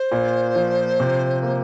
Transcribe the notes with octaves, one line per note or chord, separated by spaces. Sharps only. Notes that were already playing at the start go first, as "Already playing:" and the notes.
Already playing: C5
A#2
F3
C3
A#3